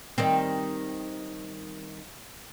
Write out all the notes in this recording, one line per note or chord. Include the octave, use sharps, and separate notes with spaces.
D#3 G3 C4